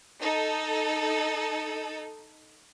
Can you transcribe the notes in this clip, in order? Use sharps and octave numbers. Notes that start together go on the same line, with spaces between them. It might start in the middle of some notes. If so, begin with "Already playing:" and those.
D#4 A4